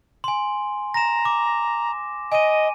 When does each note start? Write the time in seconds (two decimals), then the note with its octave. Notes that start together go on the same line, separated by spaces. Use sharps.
0.24 G#5 C6
0.94 A#5 A#6 E7
1.25 D6
2.32 D#5 G#5 D#7